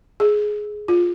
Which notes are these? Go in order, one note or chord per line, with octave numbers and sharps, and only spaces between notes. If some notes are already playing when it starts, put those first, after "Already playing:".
G#4
F4